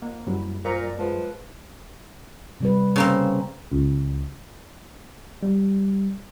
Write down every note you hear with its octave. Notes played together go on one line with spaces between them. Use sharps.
A#3
F#2 F#3 G3 E4
A#2 A#4 C5
D5
F3 G#3 B4
C3 G3 B4
C#3 A#3 C4
C#2
G3